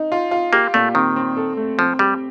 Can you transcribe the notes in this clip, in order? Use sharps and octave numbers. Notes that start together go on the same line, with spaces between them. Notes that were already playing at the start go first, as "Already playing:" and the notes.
Already playing: D#4
F4
F4
A#3 G4
A#2 A3
D#3 C4
C4
A4
A3
F3 C4
G3 G4